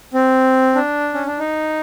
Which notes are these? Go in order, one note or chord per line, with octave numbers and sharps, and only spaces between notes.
C4
D4
C#4
D4
D#4